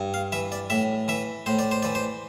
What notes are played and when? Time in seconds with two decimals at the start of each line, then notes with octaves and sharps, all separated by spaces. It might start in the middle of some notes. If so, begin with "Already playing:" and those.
Already playing: G2
0.14 F5
0.32 E3 E5
0.52 D5
0.70 A2 E5
1.08 E3 E5
1.46 A2 C5
1.59 D5
1.71 C5
1.83 E3 D5
1.95 C5